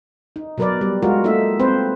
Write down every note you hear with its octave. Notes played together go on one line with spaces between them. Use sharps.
D#4
B2 F#3 A#4 B4 D5
G3
G#3 F4 F#4 A#4
A3 A#3 D#4 F4 E5
C4 B4 C5